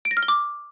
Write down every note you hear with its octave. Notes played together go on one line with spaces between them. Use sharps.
D7
A#6
F6
G7
D6